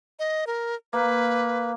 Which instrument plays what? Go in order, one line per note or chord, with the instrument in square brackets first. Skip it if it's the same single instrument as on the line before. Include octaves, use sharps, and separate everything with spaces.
[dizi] D#5
A#4
[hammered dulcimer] A#3 [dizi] B4